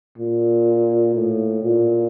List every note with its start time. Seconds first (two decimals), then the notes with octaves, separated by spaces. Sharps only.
0.18 A#2
1.15 A2
1.63 A#2